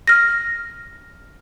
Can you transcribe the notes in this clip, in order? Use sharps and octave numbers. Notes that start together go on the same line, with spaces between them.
F6 A#6